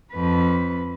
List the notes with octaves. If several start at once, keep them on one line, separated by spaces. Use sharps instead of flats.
F2 B4